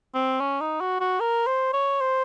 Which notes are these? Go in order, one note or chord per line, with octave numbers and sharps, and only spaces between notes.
C4
C#4
D#4
F#4
F#4
A#4
C5
C#5
C5